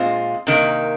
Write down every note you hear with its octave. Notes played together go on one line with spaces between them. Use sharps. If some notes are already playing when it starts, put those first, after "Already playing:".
Already playing: A#2 G#3 C4 F4
C3 D#3 A#3